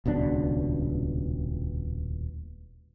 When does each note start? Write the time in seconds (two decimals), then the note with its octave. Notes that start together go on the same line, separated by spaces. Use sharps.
0.06 D#1 C#2 B2 D4